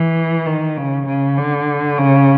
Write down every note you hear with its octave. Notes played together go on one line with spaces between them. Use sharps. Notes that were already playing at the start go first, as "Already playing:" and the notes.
Already playing: E3
D#3
C#3
C#3
D3
C#3